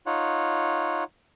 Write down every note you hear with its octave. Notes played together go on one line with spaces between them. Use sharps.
D#4 F4 C#5 F#5